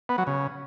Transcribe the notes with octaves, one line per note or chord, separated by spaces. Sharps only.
B3
F#3
C#3